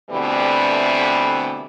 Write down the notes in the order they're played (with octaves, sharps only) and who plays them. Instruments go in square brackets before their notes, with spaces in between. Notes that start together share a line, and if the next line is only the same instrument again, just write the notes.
[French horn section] B2 D3 E3 G3 A3 C4